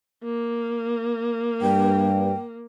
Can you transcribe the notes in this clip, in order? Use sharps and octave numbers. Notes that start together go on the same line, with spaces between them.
A#3
G2 G5